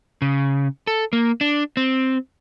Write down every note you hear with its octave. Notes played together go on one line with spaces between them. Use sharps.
C#3
A4
A#3
D4
C4